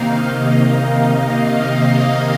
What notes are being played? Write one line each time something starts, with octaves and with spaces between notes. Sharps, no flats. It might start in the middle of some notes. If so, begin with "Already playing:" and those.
Already playing: C3 D#3 A#3 D#4 F5
D#5
F5